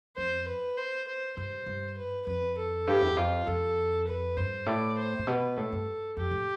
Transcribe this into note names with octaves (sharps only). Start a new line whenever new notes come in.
F2 C5
B4
C5
C5
G2 C5
G2
B4
F2 B4
A4
G2 G4
E2
F2 F4
F2 A4
B4
G2 C5
A2 D5
C5
A2
B2 B4
A2 A4
G2
F2 G4
A2